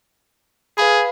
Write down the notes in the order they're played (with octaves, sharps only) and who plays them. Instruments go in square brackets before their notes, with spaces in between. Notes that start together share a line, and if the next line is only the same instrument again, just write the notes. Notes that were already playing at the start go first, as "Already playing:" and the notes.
[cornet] G#4 [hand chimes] B4 F5 B5